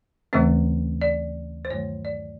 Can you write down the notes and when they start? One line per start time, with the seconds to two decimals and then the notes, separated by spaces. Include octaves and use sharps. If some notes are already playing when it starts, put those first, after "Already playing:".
0.33 D#2 C#3 E3 A3 C4 C5
1.02 D5
1.65 C5
1.70 G2 D#3 F#3 A3 C#5
2.05 D5